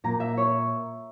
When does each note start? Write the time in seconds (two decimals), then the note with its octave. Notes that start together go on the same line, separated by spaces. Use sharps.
0.04 A#2 A#3 A#5
0.20 E5
0.37 C#5